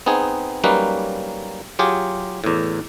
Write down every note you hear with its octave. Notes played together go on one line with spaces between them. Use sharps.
B3 C4 D#4 G#4
F#3 G3 A#3 C#4 D#4 B4
F#3 F4 G4 G#4
E2 A2